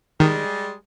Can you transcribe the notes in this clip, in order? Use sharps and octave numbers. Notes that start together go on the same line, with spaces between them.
D#3 G3 G#3